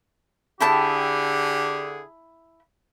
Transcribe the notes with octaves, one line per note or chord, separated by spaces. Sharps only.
D3 E4 G4 G#4 G5 A5